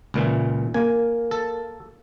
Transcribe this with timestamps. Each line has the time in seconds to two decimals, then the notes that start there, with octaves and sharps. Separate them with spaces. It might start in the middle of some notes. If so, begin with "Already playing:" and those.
0.14 C#2 A#2 E3
0.74 A#3 G#5
1.31 A4